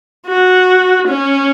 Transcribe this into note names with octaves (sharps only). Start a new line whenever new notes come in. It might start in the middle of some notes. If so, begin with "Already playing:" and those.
F#4
C#4